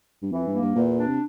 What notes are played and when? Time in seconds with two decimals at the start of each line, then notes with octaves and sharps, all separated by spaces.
0.23 G2
0.32 F2 E3
0.47 G2
0.54 A#3
0.62 G2
0.76 E2 A#2
0.98 D4
1.08 C3